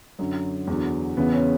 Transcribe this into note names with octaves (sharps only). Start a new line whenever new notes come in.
F#2 D3 F#3
E2 D3 F#3
E2 C#3 E3 B3
C#4